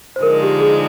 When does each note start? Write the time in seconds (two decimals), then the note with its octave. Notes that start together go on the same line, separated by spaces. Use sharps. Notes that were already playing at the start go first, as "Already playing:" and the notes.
0.16 C5
0.23 D3 F3 G#3 D#4 A#4
0.43 G4
0.60 G#4